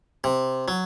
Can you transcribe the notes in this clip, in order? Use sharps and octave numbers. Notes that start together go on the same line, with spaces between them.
C3
F#3